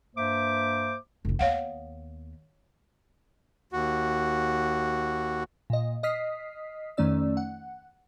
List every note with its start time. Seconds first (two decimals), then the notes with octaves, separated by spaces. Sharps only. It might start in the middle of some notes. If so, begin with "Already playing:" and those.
0.16 G2 A#3 C5 E5 D6
1.25 F1 E2
1.39 D#2 B3 C#5 F5 F#5
3.73 D#2 F#4
5.70 A#2 D#5
6.03 D#5 D#6 F6 B6 C7
6.97 F2 D#3 A3 C#4 D5 E6
7.37 F#5